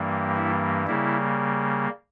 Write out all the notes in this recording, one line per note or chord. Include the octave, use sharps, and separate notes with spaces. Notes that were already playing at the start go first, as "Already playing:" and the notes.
Already playing: G2 E3 G3 A#3
E4
C#3 G3 A#3 E4